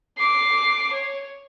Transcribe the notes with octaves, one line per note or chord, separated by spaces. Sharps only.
D6 C7
C#5